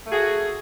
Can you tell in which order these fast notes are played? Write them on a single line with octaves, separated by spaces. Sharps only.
A3 G#4 F#4